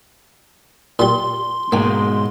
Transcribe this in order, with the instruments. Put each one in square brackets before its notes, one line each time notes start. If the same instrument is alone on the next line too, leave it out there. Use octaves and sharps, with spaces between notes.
[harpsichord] A#2 G3 [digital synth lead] C6
[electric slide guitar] G#2 B2 G#3 [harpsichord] A#3 G#5